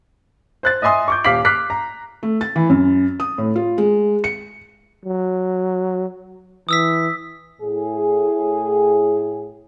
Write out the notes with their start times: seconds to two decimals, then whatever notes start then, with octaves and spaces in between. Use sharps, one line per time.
0.63 C5 F#6 A6
0.82 D#5 E5 G#5 C6 D#6
1.08 C#6 D6 G6
1.24 D#1 F5 D6 B6 F#7
1.45 D6 F6 F#6 B6 C7
1.70 A#5
2.23 A3
2.41 A6
2.56 E3
2.69 F#2
3.20 D#6
3.38 A2
3.56 F4
3.78 G#3
4.24 C#7
5.05 F#3
6.69 E3 D#6 E6 B6
7.62 A2 G#4